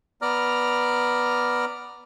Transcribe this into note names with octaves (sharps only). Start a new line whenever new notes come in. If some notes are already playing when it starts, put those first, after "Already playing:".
B3 D5 A#5 F6